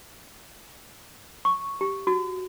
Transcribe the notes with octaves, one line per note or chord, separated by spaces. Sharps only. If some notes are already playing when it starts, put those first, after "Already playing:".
C#6
G4
F#4